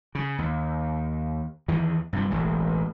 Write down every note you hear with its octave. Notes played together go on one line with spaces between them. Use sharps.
C#3
D#2
E2 D#3 E3
G2 C3 F3
E1 A1 E3